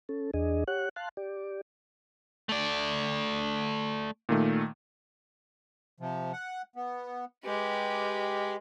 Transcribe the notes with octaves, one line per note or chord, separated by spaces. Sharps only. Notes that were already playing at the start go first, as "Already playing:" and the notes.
C#4 A4
E2 D4 G#4 D#5
G4 C#5 F#5 F#6
F5 A5 C6 F#6
G4 D5
A3 D5
A#2 D#3 A3
C3 F3
F#5
B3
G#3 G4 B4